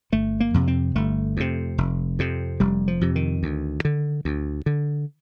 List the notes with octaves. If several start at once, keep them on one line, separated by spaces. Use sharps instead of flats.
G1 A3
A#3
F2 C3
C4
G1 A3
F2 C3
F1
F2 C3
F1 G3
F3
F2 C3
D#3
D2
D3
D2
D3